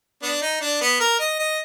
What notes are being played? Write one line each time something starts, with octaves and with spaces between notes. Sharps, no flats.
B3 D4
D#4
D4
B3
A#4
D#5
D#5